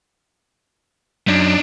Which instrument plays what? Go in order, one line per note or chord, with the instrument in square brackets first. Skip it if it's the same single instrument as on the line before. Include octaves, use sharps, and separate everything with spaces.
[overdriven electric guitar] F#2 [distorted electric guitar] D4 D#4